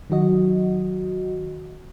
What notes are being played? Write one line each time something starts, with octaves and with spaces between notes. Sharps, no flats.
D#3 F#3 F#4 D#5